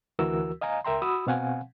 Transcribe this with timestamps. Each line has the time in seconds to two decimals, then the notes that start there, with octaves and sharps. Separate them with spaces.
0.19 D2 E3 F#4 A#4 E6
0.61 D#5 F5 G#5 A#5
0.84 C#2 A#4 E5 G5 A#5 C6
1.02 F#4 B5 D#6 E6
1.27 B2 C4 F5 F#5 G#5